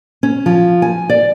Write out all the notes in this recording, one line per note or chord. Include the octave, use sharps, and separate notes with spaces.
C#4
F3
G#5
D5